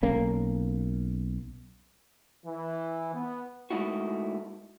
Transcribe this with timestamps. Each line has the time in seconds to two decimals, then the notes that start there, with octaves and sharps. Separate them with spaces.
0.03 B1 A#3 C#4
2.46 E3
3.14 B3
3.70 G#3 A3 D#4 E4 F#4